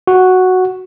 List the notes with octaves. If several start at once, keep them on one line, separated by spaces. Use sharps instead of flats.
F#4